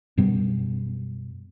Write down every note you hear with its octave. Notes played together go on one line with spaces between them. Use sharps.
F#2 B2 G3 B3